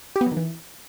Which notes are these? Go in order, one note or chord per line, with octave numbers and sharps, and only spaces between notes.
G4
B3
F#3
D#3
E3